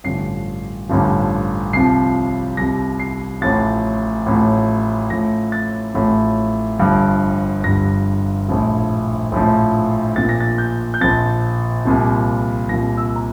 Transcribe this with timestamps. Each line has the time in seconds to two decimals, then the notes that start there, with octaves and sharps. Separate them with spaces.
0.04 A1 G2 D3 F3 C7
0.89 A1 G2 D3 F3
1.73 C2 C3 F3 C7
2.57 C2 C3 F3 A#6
2.99 C7
3.42 A1 A2 F3 A6
4.26 A1 A2 F3
5.10 A1 A2 F3 A#6
5.52 A6
5.94 A1 A2 F3
6.80 G1 G2 F3
7.64 G1 G2 F3 A#6
8.48 A#1 A2 F3
9.32 A#1 A2 F3
10.16 A#1 A#2 F3 A6
10.29 A#6
10.40 A6
10.58 G6
10.94 G6
11.01 A#1 A#2 F3 A6
11.85 C2 A#2 F3
12.69 C2 A#2 F3 A#6
12.97 E6
13.16 A#5